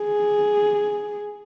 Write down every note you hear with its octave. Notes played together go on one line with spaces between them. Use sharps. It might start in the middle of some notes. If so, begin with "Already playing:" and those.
Already playing: G#4